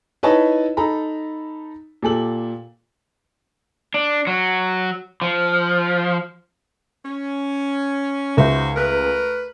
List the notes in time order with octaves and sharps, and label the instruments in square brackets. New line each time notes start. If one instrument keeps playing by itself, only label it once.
[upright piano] D#4 E4 B4 C#5 D#5 A5
D#4 A4 A#5 B5
A#2 G4 A4 F#7
[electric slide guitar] D4
F#3
F3
[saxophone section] C#4
[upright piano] C#2 E5 [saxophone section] D#4 F#4 C5
[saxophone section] A3 A#4 B4